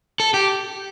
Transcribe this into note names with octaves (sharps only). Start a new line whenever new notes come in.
A4
G4